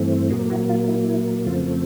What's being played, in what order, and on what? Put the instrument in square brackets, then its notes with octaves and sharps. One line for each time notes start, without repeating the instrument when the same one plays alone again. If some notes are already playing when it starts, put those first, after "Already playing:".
Already playing: [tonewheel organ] G2 E3 A3 C4
A#2 F#3 A#3 F#4 G#4
E4 F#4
F4
E4
E4
F2 C#3 F3 A3 C4 F4